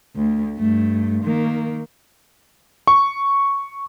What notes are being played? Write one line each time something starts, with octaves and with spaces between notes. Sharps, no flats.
D2
G2 A3
D#3 A#3
C#6